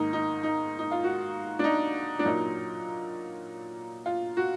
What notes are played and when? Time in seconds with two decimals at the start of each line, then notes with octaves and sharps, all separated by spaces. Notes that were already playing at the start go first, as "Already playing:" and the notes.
Already playing: G#2 D#3 A#3 D#4
0.13 D#4
0.43 D#4
0.79 D#4
0.92 F4
1.04 F#4
1.59 D4
1.64 D#4
2.19 D4
2.25 A#2 F#3 A#3 D#4
4.06 F4
4.37 F#4